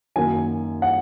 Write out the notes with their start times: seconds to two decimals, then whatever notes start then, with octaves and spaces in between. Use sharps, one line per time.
0.16 F#2 D#3 A#3 G#5
0.82 F#5